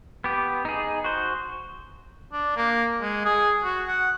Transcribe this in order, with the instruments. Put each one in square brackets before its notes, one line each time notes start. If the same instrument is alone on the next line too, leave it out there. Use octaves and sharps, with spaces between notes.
[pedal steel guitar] B3 G4
D#4 G#4
F#4 C5
[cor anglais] D4
A#3
G#3
G#4
F#4
F#5